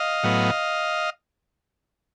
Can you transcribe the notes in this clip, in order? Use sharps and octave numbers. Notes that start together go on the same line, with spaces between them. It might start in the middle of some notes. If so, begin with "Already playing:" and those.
Already playing: D#5 F5
A2 F#3 B3